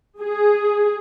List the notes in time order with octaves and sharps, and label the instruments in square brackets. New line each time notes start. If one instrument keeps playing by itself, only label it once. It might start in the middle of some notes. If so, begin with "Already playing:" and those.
[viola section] G#4